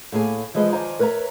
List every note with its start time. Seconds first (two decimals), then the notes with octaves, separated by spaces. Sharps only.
0.12 A2 A#3 G#4 G#5
0.54 E3 F3 G#3 G#4 C5 D#5
0.73 D#3 F3 C5 D5 G#5 A#5
0.99 A#4 B4 C#5 E5 A#5